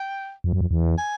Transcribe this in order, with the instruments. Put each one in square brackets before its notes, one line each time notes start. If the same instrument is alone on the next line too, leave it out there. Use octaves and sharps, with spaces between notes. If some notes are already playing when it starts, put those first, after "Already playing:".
Already playing: [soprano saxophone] G5
[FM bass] F2
F#2
F2
E2
[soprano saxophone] G#5